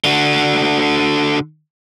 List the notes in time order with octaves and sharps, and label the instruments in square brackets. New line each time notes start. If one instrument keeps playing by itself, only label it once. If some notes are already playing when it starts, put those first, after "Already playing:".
[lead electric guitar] D3 F#4